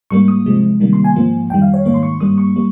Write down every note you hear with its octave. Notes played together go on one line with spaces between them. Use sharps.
G#2 G3 A#3 C#6
D#6
C3 F3 G#3
C3 D#3 G3 A#3
C6
G#5
G#2 F3 A#3
F2 D#3 G3 G5
F5
C#5
G#2 D#3 A#3 C#5
C6
C#6
G2 G3 A#3 D#6
C#6
G3 A#3